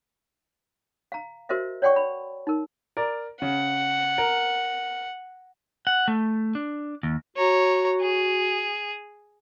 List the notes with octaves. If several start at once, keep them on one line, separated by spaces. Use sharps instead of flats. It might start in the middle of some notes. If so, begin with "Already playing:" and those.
F5 A#5
F#4 A#4 C5 D#5 E5
C#5 D5 F#5 G5 C6 C#6
B5
D#4 A#4
A#4 D5
C#3 F#5
A#4
F#5
A3
D4
D#2
F#4 C#5 A#5
G#4